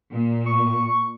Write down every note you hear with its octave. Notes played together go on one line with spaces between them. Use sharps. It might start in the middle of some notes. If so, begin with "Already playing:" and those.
A#2
C#6